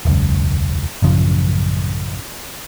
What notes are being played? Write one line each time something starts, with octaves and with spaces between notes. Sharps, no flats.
E1 C#2 F#2
A1 F#2 C#3 F3